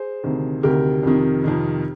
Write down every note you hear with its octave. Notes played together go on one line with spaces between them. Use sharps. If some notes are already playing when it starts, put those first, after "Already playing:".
Already playing: G#4 C5
D2 C3 D#3
D2 C3 D#3 G4 A#4
F2 C3 D#3
F2 C3 D#3